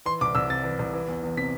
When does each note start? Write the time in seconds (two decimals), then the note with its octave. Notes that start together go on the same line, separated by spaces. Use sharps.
0.06 E3 C6
0.21 C2 D6
0.35 C2 E6
0.50 C3 A6
0.64 E3
0.79 C2
0.93 E3
1.08 E2
1.23 E2
1.37 C3 B6